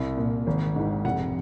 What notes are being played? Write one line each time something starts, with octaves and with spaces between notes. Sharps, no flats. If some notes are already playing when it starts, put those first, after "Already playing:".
Already playing: C2
A#2
G#1
G#2 D#3
F1 F#5